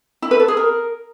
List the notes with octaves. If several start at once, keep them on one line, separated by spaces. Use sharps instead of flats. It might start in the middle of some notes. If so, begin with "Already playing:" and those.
E4
B4
A4
G#4
A#4